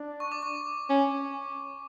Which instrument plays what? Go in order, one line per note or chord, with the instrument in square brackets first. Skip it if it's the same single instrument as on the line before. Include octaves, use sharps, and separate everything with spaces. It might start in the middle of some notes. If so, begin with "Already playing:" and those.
Already playing: [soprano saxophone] D4
[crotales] C#6
D6
C#6
[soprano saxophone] C#4